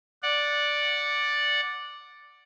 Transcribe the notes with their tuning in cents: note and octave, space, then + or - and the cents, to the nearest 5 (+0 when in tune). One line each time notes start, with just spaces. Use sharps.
D5 +0 F#5 -15